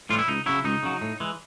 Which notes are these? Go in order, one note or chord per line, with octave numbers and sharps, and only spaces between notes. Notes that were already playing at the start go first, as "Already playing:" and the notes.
A2 E3 G3 F4
E4
C#2 D#4
C#3 F#3 E4
C#2 D#4
C#3 F#3
A2
E3 G#3